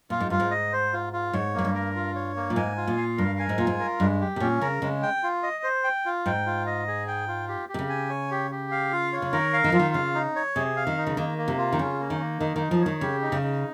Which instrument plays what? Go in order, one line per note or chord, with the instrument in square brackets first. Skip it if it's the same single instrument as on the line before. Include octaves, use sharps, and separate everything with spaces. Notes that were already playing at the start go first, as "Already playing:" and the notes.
[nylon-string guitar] A#2 [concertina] F4
[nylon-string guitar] G#2
[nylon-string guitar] G2 [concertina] F4
[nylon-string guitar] G#2
[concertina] D#5
C5
F4
F4
[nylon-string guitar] G#2 [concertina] C#5
[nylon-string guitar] G#2 [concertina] A#3
[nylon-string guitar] G2
[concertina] A#4
F4
C#5
A#3
[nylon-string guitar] A#2
[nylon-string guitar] G#2 [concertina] G#5
[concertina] F4
[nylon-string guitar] A#2
[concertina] F5
[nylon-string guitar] G2 [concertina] A#4
[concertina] G#5
[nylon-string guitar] G#2
[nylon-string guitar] A#2 [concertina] F4
[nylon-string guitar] G#2
[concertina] A#4
[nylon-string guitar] G2 [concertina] G#3
[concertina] G4
[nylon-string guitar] C3
[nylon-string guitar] A#2 [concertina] C#4
[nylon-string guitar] C#3 [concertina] A#4
[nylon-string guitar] C#3 [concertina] G#3
[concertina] G5
F4
D#5
C5
G5
F4
[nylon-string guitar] G#2 [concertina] G5
[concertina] F4
D#5
G#4
G5
F4
G4
G4
[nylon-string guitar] C3
C#3
[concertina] G#5
C#5
G4
G4
F5
F4
C#5
[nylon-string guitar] C#3
[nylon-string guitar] D#3 [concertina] A#4
[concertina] F5
[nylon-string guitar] D#3
[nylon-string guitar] F3 [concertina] F4
[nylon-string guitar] D#3
[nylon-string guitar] C#3 [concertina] F5
[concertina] D#4
C#5
[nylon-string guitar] C3 [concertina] G#4
[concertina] F5
[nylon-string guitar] D#3
[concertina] D#4
[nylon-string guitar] C#3
[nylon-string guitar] D#3 [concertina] A#3
[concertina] A#3
[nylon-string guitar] C3
[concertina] F4
[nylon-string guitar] D#3
[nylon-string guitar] C#3 [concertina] C#4
[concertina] A#3
[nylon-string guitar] D#3
[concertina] A#3
[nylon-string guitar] D#3 [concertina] D#4
[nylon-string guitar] D#3
[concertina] D#4
[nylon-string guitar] F3
[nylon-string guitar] D#3 [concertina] C#5
[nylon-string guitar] C#3 [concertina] G4
[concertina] D#4
[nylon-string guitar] C#3
[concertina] D#4